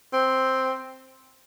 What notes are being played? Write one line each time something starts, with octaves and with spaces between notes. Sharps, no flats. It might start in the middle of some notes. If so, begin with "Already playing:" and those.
C4